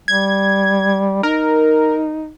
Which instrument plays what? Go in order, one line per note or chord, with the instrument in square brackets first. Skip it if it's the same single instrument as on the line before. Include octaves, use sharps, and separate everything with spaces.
[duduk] G3 [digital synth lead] G#6
[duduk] D#4 [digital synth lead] A#4